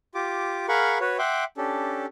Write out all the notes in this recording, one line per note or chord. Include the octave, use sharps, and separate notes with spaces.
F4 G4 D6
G#4 A#4 F5 F#5 B5 C#6
F#4 B4 C#5
E5 F#5 G5 C6 D6
C#4 D4 G4 A4